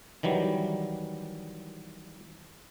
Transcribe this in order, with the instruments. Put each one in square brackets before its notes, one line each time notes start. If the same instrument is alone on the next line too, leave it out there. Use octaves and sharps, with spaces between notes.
[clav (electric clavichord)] D#3 E3 F#3 G3